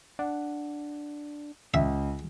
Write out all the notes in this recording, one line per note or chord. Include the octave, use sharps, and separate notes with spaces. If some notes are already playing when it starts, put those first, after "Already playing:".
D4 F#5
C#2 E5